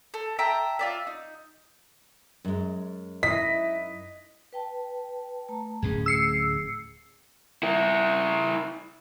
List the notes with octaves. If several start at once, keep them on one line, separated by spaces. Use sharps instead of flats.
A4
E5 G5 A5 A#5
F4 D5 E5
D#4
F#2 G#3
E4 D#5 B6
B4 G5 A5
A3 A5 A#5
D1 A2 C#4 G#4
E6 C7 C#7
E4 A#4